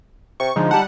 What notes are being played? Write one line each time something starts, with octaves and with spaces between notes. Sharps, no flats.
C3 C#6
D3 F3 G#3 D#4
G3 F#5 A5